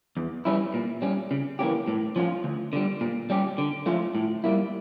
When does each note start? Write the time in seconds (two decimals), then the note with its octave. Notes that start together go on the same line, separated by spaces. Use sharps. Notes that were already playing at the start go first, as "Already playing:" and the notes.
0.17 E2
0.45 E3 G3 C#4 E4
0.74 A#2
1.02 G3 C#4
1.31 C#3
1.59 E3 A#3 C#4 G4
1.88 A2
2.16 F3 C#4 F4
2.44 D2
2.73 D3 G3
3.01 A#2
3.30 G3 C#4 G4
3.58 D3
3.86 F3 A3 C#4 F4
4.15 A2
4.44 G3 A#3 E4